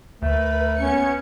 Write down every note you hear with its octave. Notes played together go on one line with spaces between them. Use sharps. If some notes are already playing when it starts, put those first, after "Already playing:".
D2 A3 A#4 B4
B3 C#4 G#6 C#7